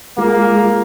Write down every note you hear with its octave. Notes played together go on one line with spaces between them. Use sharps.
G#3 A#3 F4 G#4